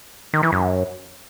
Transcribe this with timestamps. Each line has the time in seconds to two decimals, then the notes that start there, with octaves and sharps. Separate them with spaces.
0.33 D#3
0.43 E3
0.52 F#2